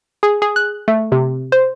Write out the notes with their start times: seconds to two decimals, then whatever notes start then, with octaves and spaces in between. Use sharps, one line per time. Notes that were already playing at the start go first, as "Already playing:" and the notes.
0.23 G#4
0.42 G#4
0.56 F#6
0.88 A3
1.12 C3
1.52 C5